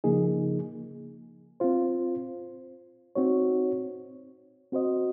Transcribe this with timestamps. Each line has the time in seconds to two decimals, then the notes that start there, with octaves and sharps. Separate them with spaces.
0.04 C#3 F3 A#3 D#4 G#4
1.60 C4 F4 C5
3.15 C4 D#4 F#4 C#5
4.72 C4 F#4 C5 D#5